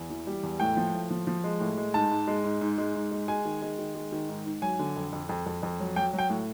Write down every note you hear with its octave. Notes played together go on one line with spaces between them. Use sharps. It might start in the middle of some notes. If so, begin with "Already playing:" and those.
Already playing: E2
E3
G3
E2
A2 G5
F3
A2
F3
F3
G#3
A2
G#3
G#2 A5
G#2
G#3
G#2
G#2
G#3
G#2
G#3
G#3 G#5
D#3
G#3
D#3
G#3
D#3
G#2
G#2
F#3 G#5
D3
F2
F2
F2
F2
F2
F#3
F#3 G5
F#3
G5
A2